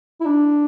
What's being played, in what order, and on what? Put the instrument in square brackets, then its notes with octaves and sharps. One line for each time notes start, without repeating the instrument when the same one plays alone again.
[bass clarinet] E4
D4